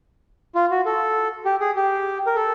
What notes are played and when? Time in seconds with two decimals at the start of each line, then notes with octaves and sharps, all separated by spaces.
0.55 F4
0.71 F#4
0.86 A4
1.45 G4
1.60 G#4
1.76 G4
2.26 A#4
2.36 A4